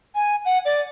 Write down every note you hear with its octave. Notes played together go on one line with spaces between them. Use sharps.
G#5
F#5
D5